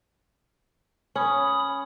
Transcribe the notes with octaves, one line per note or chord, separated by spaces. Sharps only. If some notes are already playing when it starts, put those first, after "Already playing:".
C#4 B5 D#6